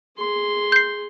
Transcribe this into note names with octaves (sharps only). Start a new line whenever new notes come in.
G#4 C6
G6 C7